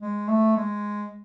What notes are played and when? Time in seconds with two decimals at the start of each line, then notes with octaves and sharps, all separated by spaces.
0.02 G#3
0.28 A3
0.57 G#3